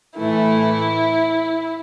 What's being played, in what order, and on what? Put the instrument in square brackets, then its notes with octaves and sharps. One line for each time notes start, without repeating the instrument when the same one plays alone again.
[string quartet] A2 E3 A3 E4